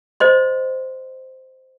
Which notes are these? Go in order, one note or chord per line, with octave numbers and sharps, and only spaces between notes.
C5 D#5 C6